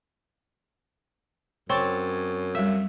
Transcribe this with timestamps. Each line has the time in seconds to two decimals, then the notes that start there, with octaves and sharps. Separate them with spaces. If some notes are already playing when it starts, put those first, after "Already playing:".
1.70 F#2 C4 C#5 A5 D6
2.55 G3 E5 F5